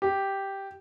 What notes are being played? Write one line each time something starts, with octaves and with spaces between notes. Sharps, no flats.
G4